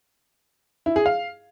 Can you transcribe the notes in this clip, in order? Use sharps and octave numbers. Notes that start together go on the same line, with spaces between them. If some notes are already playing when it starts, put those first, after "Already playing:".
E4
G#4
F5